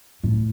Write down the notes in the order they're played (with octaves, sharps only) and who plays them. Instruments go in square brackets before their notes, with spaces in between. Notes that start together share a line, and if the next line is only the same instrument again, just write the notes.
[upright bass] A2